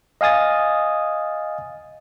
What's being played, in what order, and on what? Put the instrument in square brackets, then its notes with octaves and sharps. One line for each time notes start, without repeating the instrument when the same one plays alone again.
[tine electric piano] D#5 F5 G#5 D#6 A6